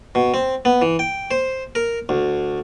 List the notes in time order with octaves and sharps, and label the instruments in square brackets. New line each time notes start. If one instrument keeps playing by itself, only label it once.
[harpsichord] B2
C4
B3
E3
G5
C5
A#4
D2